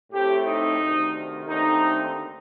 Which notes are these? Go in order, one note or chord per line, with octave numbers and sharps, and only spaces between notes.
A2 A3 C4 G4
D#4
D2 C3 D#3
D#2 D3 A3 C4 D#4